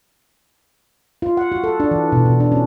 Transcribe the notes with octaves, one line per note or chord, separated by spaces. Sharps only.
F4
F#5
F#4
A4
D4
E3
B2
B2
D4
C#4